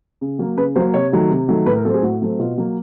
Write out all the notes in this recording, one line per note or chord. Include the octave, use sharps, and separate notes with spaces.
C#3
F#3 A#3
C#3 B4
F#3 A#3 C5
C3 C#5
D#3 F#3 A3
C3
D#3 F#3 A3
A2 B4
A#4
F#3 A3 C4 A4
G#4
A2 F#4
F#3 A3 C4
B2 F4
F#3 A#3